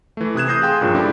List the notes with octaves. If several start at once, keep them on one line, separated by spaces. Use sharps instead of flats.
E3 A3
C3 D#6 F#6 G#6 E7
D#6 G6 A#6 C7
G#4 F5 G5 C6
G2 A#2 C#3 F3
G#3 D4 E4 F4 G4 A4